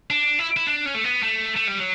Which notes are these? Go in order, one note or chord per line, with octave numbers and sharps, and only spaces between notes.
D4
E4
E4
D4
C#4
A3
B3
A3
A3
G3
F#3